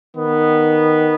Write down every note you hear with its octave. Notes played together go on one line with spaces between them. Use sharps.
D#3 B3